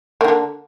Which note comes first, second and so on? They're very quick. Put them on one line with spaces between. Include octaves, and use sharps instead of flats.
A#3 D#3 D3